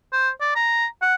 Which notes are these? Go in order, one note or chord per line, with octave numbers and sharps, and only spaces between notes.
C5
D5
A#5
F#5